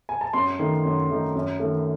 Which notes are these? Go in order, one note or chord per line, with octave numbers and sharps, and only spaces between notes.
G#5
A5
F#2 C6
D#3 A3 D#4
F#2
D#3 A3 D#4
F#2
D#3 A3